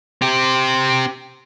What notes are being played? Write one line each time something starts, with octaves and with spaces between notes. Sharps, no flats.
C4 G4